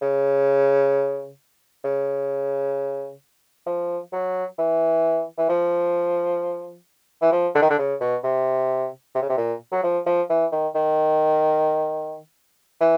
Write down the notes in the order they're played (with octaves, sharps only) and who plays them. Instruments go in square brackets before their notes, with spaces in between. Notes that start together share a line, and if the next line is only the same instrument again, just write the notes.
[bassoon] C#3
C#3
F3
F#3
E3
E3
F3
E3
F3
D3
D#3
D3
C#3
B2
C3
C3
C#3
C3
A#2
F#3
F3
F3
E3
D#3
D#3
E3